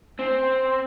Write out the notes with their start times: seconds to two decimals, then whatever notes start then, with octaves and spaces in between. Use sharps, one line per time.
0.19 C4